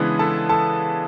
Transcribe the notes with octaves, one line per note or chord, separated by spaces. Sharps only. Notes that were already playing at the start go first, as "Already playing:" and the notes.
Already playing: C#3 E3 G#3 B3 D4
A4 A5
A4 A5